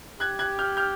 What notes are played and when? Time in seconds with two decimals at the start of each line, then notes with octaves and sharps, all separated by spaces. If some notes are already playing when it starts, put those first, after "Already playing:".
0.20 G4 F#6 G#6
0.39 F#6 G#6
0.59 F6 G6
0.77 F6 G6